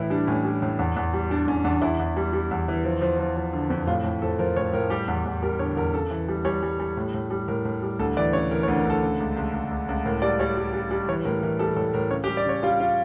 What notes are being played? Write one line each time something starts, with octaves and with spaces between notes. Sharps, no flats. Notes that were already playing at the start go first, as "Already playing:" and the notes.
Already playing: A2 E3 E4
G3 D4
A2 C#4
G3
A2
E2
E2
G3
G3 D4
E2 C#4
E2 D4
E2 E4
E2
G3
G3
E2
E3
F3
F3
F3
F3
D3
F2
A2 F4
A2
F3 A4
F3 A#4
A2 C#5
A2 A#4
G3 G4
E2
E2
G3 A#4
D3 C#5
E2 A#4
C#3 A4
E3
G3
G3 C#5
G3
G3
A2
A2
G3
A2 A#4
A2
G3
D2 A4
E3 D5
C#3 C#5
E3 A#4
C#5
D2
A#4
D2 A4
C#3
C#2
C#2
C#2
C#2
C#2
A2 A#4
G3 D5
G3 C#5
G3
G3
G3
E3 C#5
A2 A#4
E3 A#4
G3 A4
A2 A4
A2 A#4
C#3 C#5
G4
G3
D5
C#3 C#5
G3 F4
F4